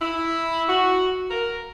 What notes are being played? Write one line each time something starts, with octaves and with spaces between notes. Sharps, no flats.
E4
F#4
A#4